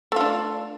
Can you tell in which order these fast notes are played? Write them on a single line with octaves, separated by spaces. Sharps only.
A3 F4 D4